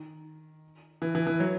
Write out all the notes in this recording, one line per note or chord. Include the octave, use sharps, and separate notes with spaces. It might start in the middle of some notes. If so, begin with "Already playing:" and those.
Already playing: D#3
E3
E3
E3
F#3